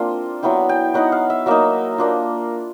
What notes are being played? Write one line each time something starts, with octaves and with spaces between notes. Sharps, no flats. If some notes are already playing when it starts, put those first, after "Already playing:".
Already playing: A#3 C4 D4 F4
F#3 B3 E4 G5
G5
F#3 B3 D#4 F#5
F5
E5
F#3 A#3 D#4 E5
A#3 D4 F4